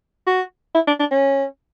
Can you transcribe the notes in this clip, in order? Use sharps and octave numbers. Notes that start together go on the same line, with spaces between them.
F#4
E4
D4
D4
C#4